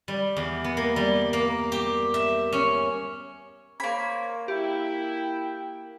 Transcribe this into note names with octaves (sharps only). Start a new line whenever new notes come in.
G3
E2
B3
A#3
G3
A#3
G4
E5
C#4
A#3 A#4 C5 C#5 B5 G#6
E4 G4 G5